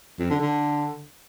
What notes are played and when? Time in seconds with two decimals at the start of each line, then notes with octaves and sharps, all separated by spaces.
0.20 F2
0.30 D3
0.41 D3